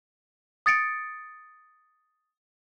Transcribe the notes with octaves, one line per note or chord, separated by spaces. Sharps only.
D#6 A6 C#7 D7